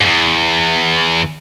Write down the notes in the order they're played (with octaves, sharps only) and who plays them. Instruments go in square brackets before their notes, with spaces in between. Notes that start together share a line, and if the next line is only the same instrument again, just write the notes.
[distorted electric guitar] E2 G#2